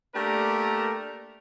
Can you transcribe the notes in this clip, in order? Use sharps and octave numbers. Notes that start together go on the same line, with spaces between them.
A3 A#3 D4 G4 A#4